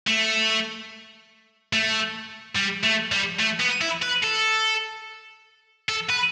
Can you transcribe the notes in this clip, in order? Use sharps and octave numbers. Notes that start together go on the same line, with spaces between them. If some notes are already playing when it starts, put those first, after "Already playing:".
A3
A3
G3
A3
G3
A3
B3
E4
B4
A4
A4
B4